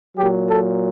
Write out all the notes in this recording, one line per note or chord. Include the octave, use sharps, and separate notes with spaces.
A#2 F#3 G4
A4